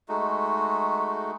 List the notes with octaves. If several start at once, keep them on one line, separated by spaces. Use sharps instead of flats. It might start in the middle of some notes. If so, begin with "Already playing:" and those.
G#3 A3 D#4 F#4